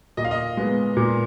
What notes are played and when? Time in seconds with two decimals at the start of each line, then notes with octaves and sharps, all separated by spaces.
0.17 A#2 D#5
0.25 F5
0.31 D#5
0.57 G#3 B3
0.97 A#2